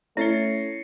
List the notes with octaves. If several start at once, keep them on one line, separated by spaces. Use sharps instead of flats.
A3 C#4 E4 A6 A#6 C7 C#7 G7